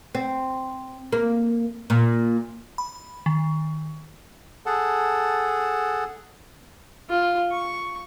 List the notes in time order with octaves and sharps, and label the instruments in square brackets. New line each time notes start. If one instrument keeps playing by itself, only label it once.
[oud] C4
A#3
A#2
[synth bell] B5
D#3
[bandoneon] G#4 A4 F#5 A5
[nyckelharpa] F4
C#6